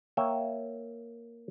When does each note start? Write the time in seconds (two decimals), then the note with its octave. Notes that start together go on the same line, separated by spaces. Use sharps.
0.17 A#3 C#5 E5 G5